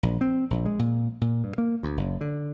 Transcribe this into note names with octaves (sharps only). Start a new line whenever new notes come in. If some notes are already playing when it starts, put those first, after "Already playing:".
A#1
C4
A#1
G#3
A#2
A#2
G2
A#3
D2
F#1
D3